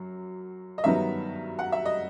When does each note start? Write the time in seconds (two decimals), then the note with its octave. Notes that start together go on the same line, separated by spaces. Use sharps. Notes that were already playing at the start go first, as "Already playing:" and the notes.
Already playing: F#2 F#3
0.78 D#5
0.84 G2 D#3 F#3 B3 E5
1.59 F#5
1.72 E5
1.86 D#5